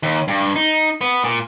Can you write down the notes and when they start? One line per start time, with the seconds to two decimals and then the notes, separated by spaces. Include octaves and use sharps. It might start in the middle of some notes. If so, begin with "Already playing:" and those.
0.03 D#2
0.28 G2
0.56 D#4
1.01 B3
1.24 A#2